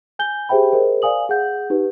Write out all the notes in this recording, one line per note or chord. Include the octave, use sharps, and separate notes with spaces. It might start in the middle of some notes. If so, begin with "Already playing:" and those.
G#5 G6 G7
G4 G#4 C5 E5 G5 B5
G#4 A#4 C5 D#5
D5 F5 G#5 D#6 F#7
G#4 F#5 G6
D#4 G4 B4